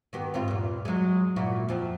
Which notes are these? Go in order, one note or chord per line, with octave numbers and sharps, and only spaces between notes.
D#3 B3 G4
G#2 C4 F4
E2 A#2
F#3 G#3
A#2 E4 F#4
F2 F3